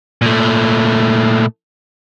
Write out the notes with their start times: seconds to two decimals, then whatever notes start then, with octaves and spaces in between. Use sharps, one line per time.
0.22 A#2 A3